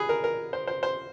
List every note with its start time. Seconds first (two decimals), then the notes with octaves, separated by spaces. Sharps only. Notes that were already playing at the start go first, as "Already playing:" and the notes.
Already playing: G#4 B4
0.09 A#4
0.24 A#4
0.53 C5
0.67 C5
0.83 C5